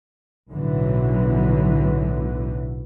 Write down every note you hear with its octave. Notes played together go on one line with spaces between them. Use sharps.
B1 A2 D3 E3 F#3